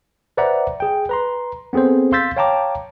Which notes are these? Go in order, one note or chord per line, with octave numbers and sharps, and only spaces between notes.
B4 C5 D5 E5 F#5 A#5
G#4 G5
B4 A#5 C6
B3 C4 G#4 A4 C5
F5 C6 E6 G6 A6 B6
C#5 F5 G5 A5 A#5 D6